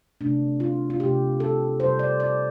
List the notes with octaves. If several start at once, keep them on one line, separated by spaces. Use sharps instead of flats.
C3 A3 D4
F4
F4
C3 A3 G4
A4
C3 G3 C5
D5
D5